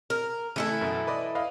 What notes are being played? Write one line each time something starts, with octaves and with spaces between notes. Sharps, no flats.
A#4
C#3 E3 A3 E4 A4 C#7
F#2 B2
B4 D5 D#5
B4 D#5 F5